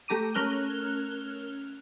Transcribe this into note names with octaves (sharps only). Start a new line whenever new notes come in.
A3 G4 A#5 D6 D#7
A3 C#4 A#4 F6 F#6 G7